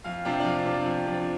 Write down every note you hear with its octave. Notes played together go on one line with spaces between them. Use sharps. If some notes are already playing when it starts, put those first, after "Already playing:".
F2 F5
C3 F3 D4 G5
D5
F2 F5
C3 F3 D4
F2
C3 F3 D4